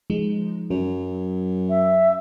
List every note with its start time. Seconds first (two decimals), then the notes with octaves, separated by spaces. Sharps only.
0.10 F3 G#3 D#4
0.71 F#2 F#3
1.69 E5